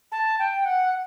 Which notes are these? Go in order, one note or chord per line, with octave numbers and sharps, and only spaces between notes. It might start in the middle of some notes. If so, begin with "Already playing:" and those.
A5
G5
F#5